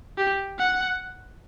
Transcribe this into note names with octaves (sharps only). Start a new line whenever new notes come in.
G4
F#5